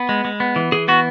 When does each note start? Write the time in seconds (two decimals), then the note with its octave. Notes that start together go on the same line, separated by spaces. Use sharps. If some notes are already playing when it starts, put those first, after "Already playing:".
Already playing: B3 B5
0.09 G#3
0.25 G#3
0.40 B3
0.56 E3
0.72 E3 G#4
0.88 B3 F#4